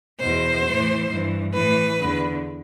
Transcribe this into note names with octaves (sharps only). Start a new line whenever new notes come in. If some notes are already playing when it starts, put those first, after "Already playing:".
E2 B2 C5
A2 E3
G2 E3
A2 E3 B4
E2 D3